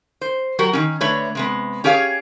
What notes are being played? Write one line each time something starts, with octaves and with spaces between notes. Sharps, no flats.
C5
F#3 F#4 G4 A#4
D#3 E3 C#4
D3 A3 B4 C#5
C3 G#3 B3
C#4 G4 G#4 C#5 F5